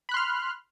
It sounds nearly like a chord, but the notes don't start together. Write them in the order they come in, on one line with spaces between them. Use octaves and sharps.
B5 F#6 C6 F6